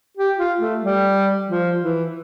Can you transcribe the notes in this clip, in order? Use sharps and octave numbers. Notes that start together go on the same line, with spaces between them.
G4
F4
A3
G3
F3
E3